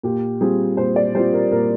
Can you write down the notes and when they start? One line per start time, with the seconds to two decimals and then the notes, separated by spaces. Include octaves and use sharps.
0.03 A#2 G4
0.41 G3 C4 F4 G#4
0.77 A#2 C5
0.96 D5
1.15 G3 C4 F4 C5
1.33 A#4
1.52 A#2 A#4